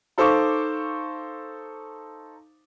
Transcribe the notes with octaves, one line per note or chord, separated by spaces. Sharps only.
D#4 A4 C5 F5 C#6 D6